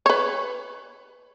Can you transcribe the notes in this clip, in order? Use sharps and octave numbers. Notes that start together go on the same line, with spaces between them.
B4 C#5